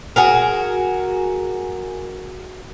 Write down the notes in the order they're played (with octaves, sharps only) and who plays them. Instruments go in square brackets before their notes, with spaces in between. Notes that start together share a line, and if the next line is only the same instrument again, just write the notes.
[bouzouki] F#4 G#4 A#4